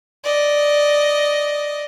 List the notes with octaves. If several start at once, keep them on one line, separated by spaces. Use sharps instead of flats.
D5 D#5